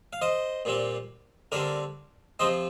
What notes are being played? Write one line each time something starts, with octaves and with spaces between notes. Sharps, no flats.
F5
C5 D#5
A#2 G3 C4
D3 G3 C4 A#4 D5
C3 F3 C4 C5 D#5